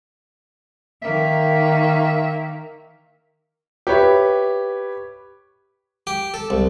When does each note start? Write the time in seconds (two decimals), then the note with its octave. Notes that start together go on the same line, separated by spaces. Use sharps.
1.02 D#3 A#3 E5
3.87 G4 B4 C#5 E5
6.07 G4
6.34 A4
6.50 C2